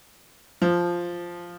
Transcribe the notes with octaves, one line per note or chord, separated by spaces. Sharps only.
F3